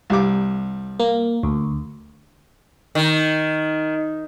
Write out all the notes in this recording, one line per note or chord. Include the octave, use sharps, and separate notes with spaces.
C2 G3 D6
A#3
D2
D#3